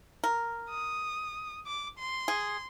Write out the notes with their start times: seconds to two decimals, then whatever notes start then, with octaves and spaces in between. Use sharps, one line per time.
0.24 A#4
0.70 D#6
1.67 D6
1.99 C6
2.28 G#4